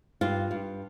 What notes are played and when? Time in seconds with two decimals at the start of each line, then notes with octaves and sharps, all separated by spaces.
0.21 G2 F4
0.51 G2